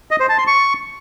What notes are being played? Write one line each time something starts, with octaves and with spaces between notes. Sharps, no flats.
D#5
C5
A5
C6
C#6